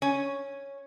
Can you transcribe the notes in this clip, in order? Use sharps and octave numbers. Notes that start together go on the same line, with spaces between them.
C#4